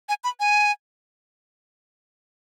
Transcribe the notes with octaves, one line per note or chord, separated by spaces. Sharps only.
G#5
B5
G#5